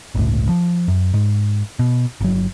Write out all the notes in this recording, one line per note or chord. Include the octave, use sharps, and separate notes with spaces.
G1 C#2 A2
F3
F#2
G#2
B2
G1 F#3